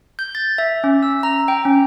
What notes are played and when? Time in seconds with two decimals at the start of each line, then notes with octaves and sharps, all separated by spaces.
0.19 G6
0.35 A6
0.58 E5
0.84 C#4
1.03 E6
1.23 A#5
1.48 G5
1.65 C#4